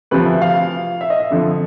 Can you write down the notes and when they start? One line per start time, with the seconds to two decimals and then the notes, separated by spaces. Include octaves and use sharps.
0.11 D2 C3 F3 B4
0.26 E5
0.42 F5
1.01 E5
1.10 D#5
1.20 E5
1.30 F2 D3 F3